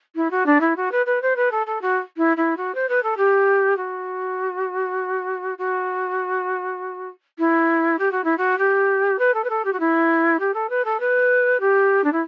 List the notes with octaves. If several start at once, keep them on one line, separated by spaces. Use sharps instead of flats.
E4
F#4
D4
E4
F#4
B4
B4
C5
B4
A4
A4
F#4
E4
E4
F#4
C5
B4
A4
G4
F#4
F#4
E4
G4
F#4
E4
F#4
G4
B4
A4
B4
A4
G4
F#4
E4
G4
A4
B4
A4
B4
G4
D4
E4